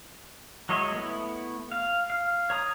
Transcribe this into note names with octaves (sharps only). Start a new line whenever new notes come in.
F#3 G#3 C#5 D#5 E5
A3 B3 E4
F5
F5
C#5 A#5 D#6